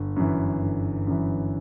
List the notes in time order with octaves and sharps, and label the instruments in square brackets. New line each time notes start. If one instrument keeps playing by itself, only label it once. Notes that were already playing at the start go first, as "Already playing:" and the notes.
Already playing: [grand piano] G1
F#2 E3
G1
F#2 E3